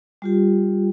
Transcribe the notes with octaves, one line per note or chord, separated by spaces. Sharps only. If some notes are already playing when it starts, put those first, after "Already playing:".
G3 F4 G4